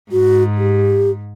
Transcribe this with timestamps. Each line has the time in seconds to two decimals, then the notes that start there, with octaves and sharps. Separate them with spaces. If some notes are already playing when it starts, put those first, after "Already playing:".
0.12 G#2 F#4
0.58 G4